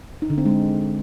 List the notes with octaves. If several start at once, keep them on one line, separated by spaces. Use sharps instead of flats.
D#4
D3
C4
G#3